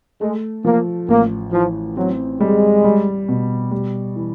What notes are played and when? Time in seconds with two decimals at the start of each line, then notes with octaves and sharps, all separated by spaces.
0.21 G#3 A3
0.64 F3 A#3
1.08 A1 A#3
1.52 E3 F3
1.97 F#3 C4
2.40 G3 G#3
2.84 G3
3.29 B2
3.71 G3
4.16 E3